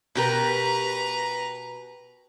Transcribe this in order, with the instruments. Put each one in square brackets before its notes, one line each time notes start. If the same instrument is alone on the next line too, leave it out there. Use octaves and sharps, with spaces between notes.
[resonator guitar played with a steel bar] B2 G4 A#4 [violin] B4 A#5